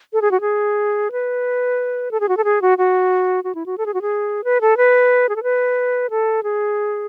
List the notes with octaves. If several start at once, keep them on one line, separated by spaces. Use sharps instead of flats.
A4
G#4
F#4
G#4
B4
A4
G#4
F#4
A4
G#4
F#4
F#4
F#4
E4
F#4
A4
G#4
F#4
G#4
B4
A4
B4
G#4
A4
B4
A4
G#4